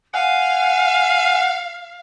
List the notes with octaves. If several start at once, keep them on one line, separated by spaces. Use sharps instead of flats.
F5 F#5 G#5